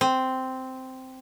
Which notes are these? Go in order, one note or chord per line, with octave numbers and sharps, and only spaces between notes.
C4